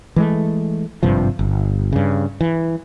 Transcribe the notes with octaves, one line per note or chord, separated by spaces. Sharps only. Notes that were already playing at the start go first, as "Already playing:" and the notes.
E3 G#3 A3
G#1 G2 C3 F3
G1
G2 C#3
E3